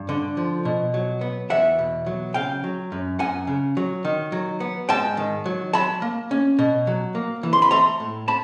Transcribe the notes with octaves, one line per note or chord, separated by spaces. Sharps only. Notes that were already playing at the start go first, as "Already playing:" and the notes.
Already playing: G2
D3
F3
B2
F#3
B3
E2 E5 F#5
B2
F#3
C#3 F5 G5
F#3
F#2
F#2 F#5 G#5
C#3
F#3
D#3
F#3
B3
G#2 G5 A5
D#3
F#3
F#3 A5 B5
A#3
C#4
B2
F#3
A#3
E3
C6
B5
A3 A#5 C6
A2
A5 B5